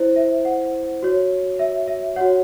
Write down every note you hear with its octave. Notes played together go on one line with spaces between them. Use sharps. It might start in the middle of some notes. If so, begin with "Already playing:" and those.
Already playing: E4 C5
E5
F#5
F#4 C#5
E5
E5
F#4 C#5 F#5